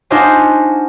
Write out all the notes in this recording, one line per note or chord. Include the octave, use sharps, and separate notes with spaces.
D4 D#4 F4 F#4 C5 G#5